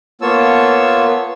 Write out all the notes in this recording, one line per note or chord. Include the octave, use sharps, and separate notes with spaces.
A#3 B3 F4 C#5 A5 E6